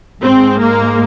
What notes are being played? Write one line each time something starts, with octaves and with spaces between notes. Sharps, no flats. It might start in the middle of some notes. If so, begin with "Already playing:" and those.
G#2 C4
G#3
A#3